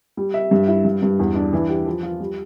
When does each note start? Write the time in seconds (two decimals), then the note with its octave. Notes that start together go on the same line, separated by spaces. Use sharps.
0.17 G3
0.34 E5
0.51 G2
0.68 E4
0.84 G2
1.02 G2
1.19 E2
1.35 D4
1.53 E3
1.69 G4
1.86 F3
2.03 F4
2.20 G3